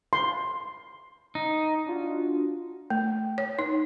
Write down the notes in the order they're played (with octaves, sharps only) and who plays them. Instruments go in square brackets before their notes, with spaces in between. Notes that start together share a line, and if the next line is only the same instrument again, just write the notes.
[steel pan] C6
[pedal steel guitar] D#4
[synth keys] D4 F4 F#4
[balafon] A3
C#5
D#4